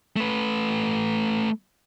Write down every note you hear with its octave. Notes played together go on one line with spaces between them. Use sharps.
A3 B4